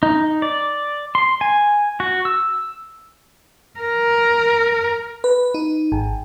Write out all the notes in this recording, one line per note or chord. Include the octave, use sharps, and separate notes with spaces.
D#4
D5
C6
G#5
F#4
E6
A#4
B4
D#4
G#1